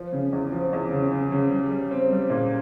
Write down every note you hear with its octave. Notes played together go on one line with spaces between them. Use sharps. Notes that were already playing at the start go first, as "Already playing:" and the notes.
Already playing: F3
C#3
E2
F3
E2
C#3
C#3
C#3
G3
G3
C4
G3
A#2